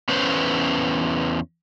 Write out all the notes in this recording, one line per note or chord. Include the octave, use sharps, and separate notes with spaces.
E2 C#4 B4 C5